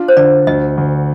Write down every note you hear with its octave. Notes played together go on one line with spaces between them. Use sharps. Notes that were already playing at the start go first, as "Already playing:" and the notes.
Already playing: D4 F4
C5
D3 D5
D2 D#5
D2